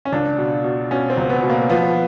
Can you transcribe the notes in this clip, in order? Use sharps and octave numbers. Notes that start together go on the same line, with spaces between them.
C#4
C#2 D4
B2
B2
B2 C#4
C4
C#2
B3
B2
A#3
F3 B3